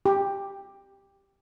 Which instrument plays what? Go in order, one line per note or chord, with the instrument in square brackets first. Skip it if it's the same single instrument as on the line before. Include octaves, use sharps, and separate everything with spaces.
[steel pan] G4